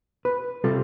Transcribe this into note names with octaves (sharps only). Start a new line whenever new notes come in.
B4
C3 G3 C4 F4 A4